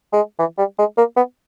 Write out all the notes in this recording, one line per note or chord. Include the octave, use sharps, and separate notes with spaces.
G#3
E3
G3
G#3
A#3
B3